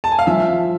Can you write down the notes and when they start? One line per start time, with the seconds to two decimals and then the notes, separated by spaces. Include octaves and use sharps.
0.04 A5
0.12 G#5
0.19 F5
0.27 F3 E5